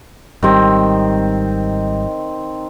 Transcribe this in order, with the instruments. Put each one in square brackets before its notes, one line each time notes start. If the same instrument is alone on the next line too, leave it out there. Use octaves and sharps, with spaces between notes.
[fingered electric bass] G#1 G3 [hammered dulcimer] D#3 C4